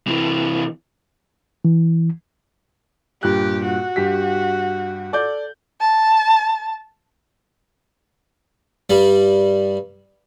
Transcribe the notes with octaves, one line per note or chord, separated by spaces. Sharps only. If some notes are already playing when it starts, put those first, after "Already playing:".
C3 E3
E3
G2 A#2 G4 F#6
F#4
G2 G4 B6
A4 D5 G6
A5
G2 G3